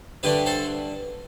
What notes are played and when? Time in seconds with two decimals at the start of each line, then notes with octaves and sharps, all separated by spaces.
0.23 G2 D3 A3 G4 B4
0.46 A4 C5